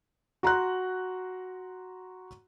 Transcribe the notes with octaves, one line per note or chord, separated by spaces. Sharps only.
F#4 A#5 C6 F#6